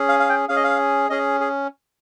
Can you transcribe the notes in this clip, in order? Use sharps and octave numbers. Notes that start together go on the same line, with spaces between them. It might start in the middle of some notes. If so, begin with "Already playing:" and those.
Already playing: C#4 G#4
F5
F5
G5
C#4 G#4 F5
D#5
F5
C#4 G#4 D#5
G#4